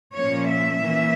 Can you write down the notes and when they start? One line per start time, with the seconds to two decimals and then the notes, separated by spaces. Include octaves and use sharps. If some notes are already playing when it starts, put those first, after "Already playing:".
0.14 A#2 F3 A#3 C#4 C#5
0.49 E5
0.82 E3 A#3 C#4